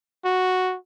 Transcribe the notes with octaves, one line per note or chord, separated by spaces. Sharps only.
F#4